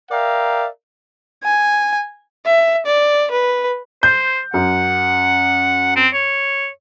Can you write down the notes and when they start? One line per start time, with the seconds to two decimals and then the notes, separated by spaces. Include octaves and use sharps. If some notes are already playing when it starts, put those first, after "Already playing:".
0.11 A#4 D5 E5 F5 G5 A#5
1.44 G#5
2.45 E5
2.86 D5
3.31 B4
4.03 C5 G6
4.54 F#2 F#5
5.96 C4
6.14 C#5